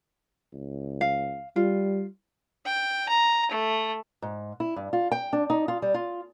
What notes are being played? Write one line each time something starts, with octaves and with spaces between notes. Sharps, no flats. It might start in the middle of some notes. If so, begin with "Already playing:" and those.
C#2
F5
G3 F4
G5
A#5
A3
G#2
E4
G2
F4
G5
D4
D#4
F4
G3
F4